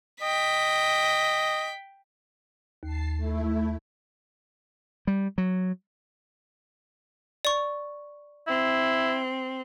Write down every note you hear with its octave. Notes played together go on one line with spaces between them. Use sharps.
D#5 G5 B6
D#2 A5 C7
A3 E4
G3
F#3
D5 C#6
C4 E4